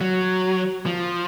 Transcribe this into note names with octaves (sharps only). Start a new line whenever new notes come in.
F#3
F3